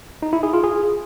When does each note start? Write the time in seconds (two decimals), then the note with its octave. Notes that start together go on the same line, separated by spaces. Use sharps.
0.22 D#4
0.33 E4
0.43 G#4
0.53 F4
0.64 G#4